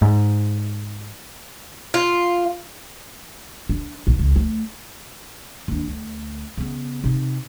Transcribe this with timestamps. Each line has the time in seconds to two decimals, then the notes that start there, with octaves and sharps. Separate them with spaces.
0.02 G#2
1.94 F4
3.69 D4
4.07 B1
4.19 C#2
4.36 A3
5.68 D#2 D4
5.88 D2
6.57 C#3 B3
7.04 C3 D#4